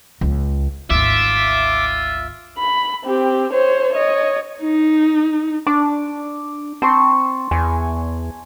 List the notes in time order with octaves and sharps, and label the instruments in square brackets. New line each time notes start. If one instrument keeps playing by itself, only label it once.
[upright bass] C#2
[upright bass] G#1 D2 [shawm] F4 [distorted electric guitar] E5 [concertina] D6
[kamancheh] B5
C4 G4
C5 C#5
C#5 D#5
[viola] D#4
[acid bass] D4 [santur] D6
[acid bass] C4 [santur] A5 C6 C#6
[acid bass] E2 [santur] G#5